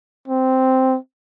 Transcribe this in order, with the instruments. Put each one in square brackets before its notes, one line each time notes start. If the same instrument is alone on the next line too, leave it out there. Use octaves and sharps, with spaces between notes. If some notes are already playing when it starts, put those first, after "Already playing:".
[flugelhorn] C4